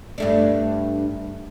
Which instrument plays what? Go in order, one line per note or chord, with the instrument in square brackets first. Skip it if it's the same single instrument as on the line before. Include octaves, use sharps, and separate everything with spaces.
[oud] G2 A3 D4